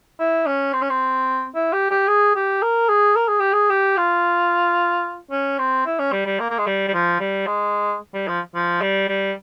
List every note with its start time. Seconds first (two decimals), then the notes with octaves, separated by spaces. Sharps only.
0.19 E4
0.46 C#4
0.73 C4
0.82 C#4
0.90 C4
1.55 E4
1.72 G4
1.90 G4
2.08 G#4
2.35 G4
2.62 A#4
2.89 G#4
3.16 A#4
3.28 G#4
3.40 G4
3.53 G#4
3.70 G4
3.97 F4
5.31 C#4
5.58 C4
5.86 E4
5.99 C#4
6.12 G3
6.26 G3
6.39 A#3
6.50 A#3
6.58 G#3
6.67 G3
6.88 G3
6.94 F3
7.20 G3
7.47 G#3
8.14 G3
8.28 F3
8.55 F3
8.81 G3
9.08 G3